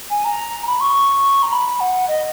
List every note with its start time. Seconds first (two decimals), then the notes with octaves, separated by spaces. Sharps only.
0.10 G#5
0.25 A#5
0.67 B5
0.81 C#6
1.43 A#5
1.52 B5
1.80 F#5
2.08 D#5